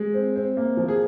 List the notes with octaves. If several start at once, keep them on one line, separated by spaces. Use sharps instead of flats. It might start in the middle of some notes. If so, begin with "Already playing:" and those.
Already playing: G#3
C4
C4
A#3
F3
G#4